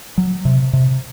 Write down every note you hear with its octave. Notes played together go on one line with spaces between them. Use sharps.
F#3
C3
C3